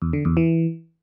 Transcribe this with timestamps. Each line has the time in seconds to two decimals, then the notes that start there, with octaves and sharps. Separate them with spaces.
0.02 E2
0.13 D3
0.25 E2
0.37 E3